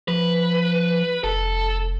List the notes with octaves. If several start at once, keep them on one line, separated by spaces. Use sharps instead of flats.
F3 B4
F1 A4